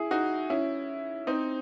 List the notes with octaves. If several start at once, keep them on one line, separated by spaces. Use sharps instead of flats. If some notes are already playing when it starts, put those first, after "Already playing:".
Already playing: E4 G#4
D#4 F#4
C#4 E4
C4 D#4